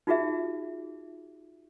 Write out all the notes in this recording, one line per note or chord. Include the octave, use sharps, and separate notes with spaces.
D#4 F4 F#4 G#4 E5